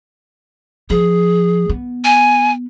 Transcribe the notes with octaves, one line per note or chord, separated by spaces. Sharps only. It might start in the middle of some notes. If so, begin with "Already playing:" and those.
F3 G#4
B3
G#5